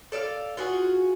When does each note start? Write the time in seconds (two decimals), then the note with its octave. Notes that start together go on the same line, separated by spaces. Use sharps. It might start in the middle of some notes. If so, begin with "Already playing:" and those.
0.12 A4 D5 D#5 F5
0.57 F4 F#4 G#4